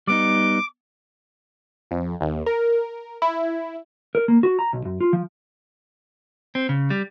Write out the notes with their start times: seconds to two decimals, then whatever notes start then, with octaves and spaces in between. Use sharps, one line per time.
0.07 G3 B3 D#4 D6
1.91 F2
2.21 D#2
2.46 A#4
3.22 E4
4.15 A#4
4.28 A#3
4.43 F#4
4.59 A#5
4.73 B1
4.85 F#2
5.01 F4
5.13 F3
6.55 C4
6.69 C#3
6.90 G3